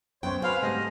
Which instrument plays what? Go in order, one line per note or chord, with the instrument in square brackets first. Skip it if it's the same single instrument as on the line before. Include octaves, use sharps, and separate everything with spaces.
[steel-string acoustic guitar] F#2 G5 [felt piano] B3 [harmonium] C5 C#5
[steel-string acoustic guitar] C4 [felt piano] F#4 F#5 B5 [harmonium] B4 C5 G#5 [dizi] F5
[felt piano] G#2 G3 A3 [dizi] D#5